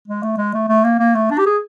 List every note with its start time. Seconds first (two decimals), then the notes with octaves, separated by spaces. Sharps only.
0.08 G#3
0.23 A3
0.38 G#3
0.54 A3
0.69 A3
0.84 A#3
0.99 A#3
1.15 A3
1.31 D4
1.39 G4
1.46 G#4